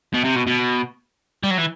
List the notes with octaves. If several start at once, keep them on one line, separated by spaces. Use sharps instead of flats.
B2
C3
B2
B2
G3
F#3
E3